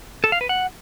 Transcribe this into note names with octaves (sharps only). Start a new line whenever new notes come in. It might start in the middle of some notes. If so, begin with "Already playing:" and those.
A4
F5
B4
F#5